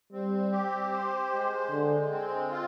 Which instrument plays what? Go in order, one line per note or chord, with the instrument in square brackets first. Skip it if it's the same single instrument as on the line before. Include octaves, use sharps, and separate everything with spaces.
[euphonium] G3 [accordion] C4
[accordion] G4
C5
G#3
[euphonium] D3 [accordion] G#3
[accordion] C4
F4